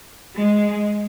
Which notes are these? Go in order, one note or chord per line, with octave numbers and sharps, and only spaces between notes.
G#3